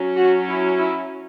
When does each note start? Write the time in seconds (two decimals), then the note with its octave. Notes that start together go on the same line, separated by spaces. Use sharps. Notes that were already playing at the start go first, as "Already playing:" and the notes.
Already playing: F#3 C#4
0.16 F#4
0.48 E4
0.79 E4